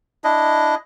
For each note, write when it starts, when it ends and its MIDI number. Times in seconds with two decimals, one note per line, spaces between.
0.24 0.75 62
0.24 0.75 64
0.24 0.75 75